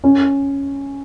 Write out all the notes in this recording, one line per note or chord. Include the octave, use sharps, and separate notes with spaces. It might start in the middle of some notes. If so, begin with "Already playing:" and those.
C#4